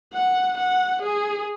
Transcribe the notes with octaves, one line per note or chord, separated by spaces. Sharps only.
F#5
F#5
G#4